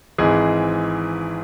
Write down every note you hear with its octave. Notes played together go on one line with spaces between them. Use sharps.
G#1 G#2 E3 G#4